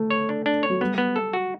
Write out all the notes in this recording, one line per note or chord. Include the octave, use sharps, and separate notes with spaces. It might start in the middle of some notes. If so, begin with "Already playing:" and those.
Already playing: A3
C#5
D4
D4
C#5
F#3
G3 B3
B3
A4
F#4